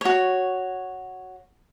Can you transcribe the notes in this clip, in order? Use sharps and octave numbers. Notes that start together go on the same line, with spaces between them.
F#4 C#5